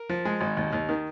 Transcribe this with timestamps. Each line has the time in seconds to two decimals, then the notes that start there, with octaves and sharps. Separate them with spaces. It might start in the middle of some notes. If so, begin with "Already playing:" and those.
Already playing: A#4
0.09 F3
0.25 G#3
0.41 G#1
0.57 D#2
0.73 D#2
0.89 D#3